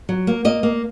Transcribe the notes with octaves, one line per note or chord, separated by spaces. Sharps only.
F#3
A#3
A#3 D#5
A#3